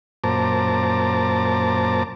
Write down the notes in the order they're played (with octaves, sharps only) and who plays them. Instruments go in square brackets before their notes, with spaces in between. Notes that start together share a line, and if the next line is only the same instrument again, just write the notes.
[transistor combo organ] F#2 A#2 C5 A5 A#5 D6